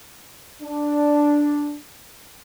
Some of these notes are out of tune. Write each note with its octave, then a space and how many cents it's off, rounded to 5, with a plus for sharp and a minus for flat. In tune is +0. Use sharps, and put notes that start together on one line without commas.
D4 +0